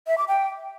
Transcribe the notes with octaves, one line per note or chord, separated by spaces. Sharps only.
E5
D6
G5